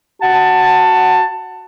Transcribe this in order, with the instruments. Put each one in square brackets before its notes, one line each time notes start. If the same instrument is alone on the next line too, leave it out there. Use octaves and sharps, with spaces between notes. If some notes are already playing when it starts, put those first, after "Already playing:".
[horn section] F#4 F#5 A5